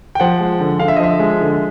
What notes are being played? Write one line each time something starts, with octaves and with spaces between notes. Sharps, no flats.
G5
F3 F#5
G#3
D3
D3 F5
E5
D#5
F3 E5
G#3
D3